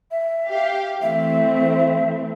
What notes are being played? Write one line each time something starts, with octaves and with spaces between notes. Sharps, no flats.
E5
G4 F5
E3 A3 C4 E5